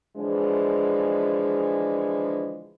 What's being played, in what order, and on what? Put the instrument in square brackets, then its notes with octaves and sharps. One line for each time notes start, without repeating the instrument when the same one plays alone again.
[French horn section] D3 E3 F3 G#3